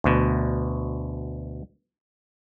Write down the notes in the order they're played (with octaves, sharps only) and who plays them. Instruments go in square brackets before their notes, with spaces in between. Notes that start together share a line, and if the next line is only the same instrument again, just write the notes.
[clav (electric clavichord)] D2 B2